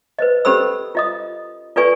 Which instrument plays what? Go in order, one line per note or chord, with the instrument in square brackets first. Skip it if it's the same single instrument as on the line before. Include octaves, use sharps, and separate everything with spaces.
[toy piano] B4 C5 D#5
C#4 G4 A4 C5 B5 E6
F4 D#5 D#6
F4 A4 B4 D5 G#5 C#6